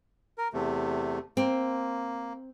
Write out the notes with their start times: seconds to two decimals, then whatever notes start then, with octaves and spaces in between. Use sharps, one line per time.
0.38 A#4
0.54 E2 C3 A3
1.37 A#3 C4